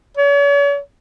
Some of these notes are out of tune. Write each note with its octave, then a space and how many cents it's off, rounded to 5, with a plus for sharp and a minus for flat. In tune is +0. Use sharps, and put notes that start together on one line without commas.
C#5 +45